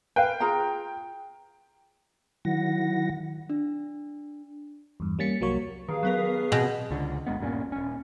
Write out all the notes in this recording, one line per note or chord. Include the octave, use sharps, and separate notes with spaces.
B4 F5 G5
F4 G#4 A#5
D#3 F#3 E4 F#5 A#6
D4
E2 G2
G3 A#3 C#4 A6 B6 C#7
C2 F#3 A#3 C#5
G2 D#3 G#4 F5
F#3 B3 A#4
B2 C4 G#4
C#2 D3
G1 G#3 B3
D#1 G2 A#2 C#4
D#1 C#4